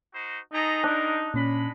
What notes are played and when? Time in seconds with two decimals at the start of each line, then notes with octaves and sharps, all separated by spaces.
0.13 D#4 F#4 C5
0.53 D#4 G#4 A4 A#5
0.83 G3 G#3 D4 A#4
1.34 A#2 G#3 C#4 B5